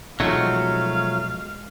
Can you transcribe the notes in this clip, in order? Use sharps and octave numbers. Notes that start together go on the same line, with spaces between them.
B2 F3 F#3 G#3 A3 D#4 F#4 F5